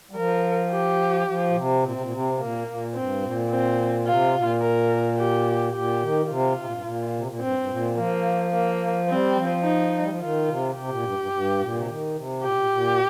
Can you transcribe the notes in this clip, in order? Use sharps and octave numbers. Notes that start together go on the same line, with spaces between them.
G3
F3 A#4
G4
F3
A#2
C3
A#2 C4
C3
A#2
C3
A#2 A#3
A#2
G2 C4
A#2
C4
C3 F4
A#2
A#4
G4
A#2 G4
D#3
D#3
C3 F4
C3
A#2
G2
A#2
C3
A#2
G2 C4
G2
A#2
F3 A#3
A#3
G3 C4
F3
D#4
G3
F3
D#3 F4
C3
C3 G4
A#2
G2
G2
G2
A#2
C3
D#3
C3
A#2 G4
C3
A#2
A#2